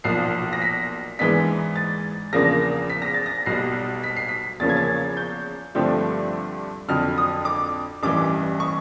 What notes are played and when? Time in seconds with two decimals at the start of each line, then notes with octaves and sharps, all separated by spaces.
0.04 B1 A#2 F3 C7
0.53 A#6
0.62 B6
1.19 G#2 E3 G#3 B3 D4 B6
1.76 A6
2.33 E2 C#3 F3 A#3 D4 A#6
2.90 B6
3.02 A#6
3.14 A6
3.26 A#6
3.46 B1 B2 G3 C7
4.04 B6
4.16 C7
4.29 B6
4.60 E2 C#3 F3 A#3 C#4 A6
4.69 G#6
4.77 A6
5.17 G6
5.75 G2 D3 F3 A3 C4
6.88 F2 D3 F#3 F6
7.18 D#6
7.45 D6
8.03 A1 G2 E3 D6
8.60 C#6